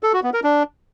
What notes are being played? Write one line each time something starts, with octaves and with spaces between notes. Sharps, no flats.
A4
F#4
B3
A#4
D4